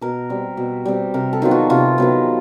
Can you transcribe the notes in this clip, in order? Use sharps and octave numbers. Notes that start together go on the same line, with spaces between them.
B2 A#4
G3 C4
B2
G3 C4
C3 A#4
A4
D#3 F#3 B3 F4
F#4
C3 F4
D#3 F#3 B3